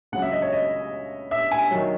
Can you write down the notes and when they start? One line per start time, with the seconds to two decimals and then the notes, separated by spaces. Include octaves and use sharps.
0.12 C#2 C#3 F#3 F#5
0.22 E5
0.32 D#5
0.42 C#5
0.53 D#5
1.31 E5
1.51 G#5
1.71 D#3 F#3